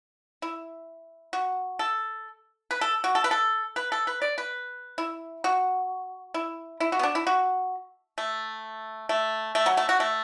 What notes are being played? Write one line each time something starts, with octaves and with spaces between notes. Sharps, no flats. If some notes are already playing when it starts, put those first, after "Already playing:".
E4
F#4
A4
B4
A4
F#4
A4
B4
A4
B4
A4
B4
D5
B4
E4
F#4
E4
E4
F#4
B3
D4
E4
F#4
A3
A3
A3
F#3
A3
F#4
A3